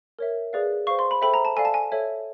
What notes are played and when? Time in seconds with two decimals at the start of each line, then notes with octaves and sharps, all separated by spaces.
0.19 A#4 C#5 E5
0.53 G#4 B4 D5 F5
0.87 C5 F5 C#6
0.99 C6
1.11 B5
1.22 A4 C5 E5 G5 B5
1.34 A#5
1.45 A5
1.56 A4 D5 F5 G#5
1.65 A5
1.74 G#5
1.92 A4 C#5 E5